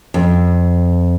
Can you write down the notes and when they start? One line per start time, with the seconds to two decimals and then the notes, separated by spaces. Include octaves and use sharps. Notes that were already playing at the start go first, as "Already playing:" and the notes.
0.14 F2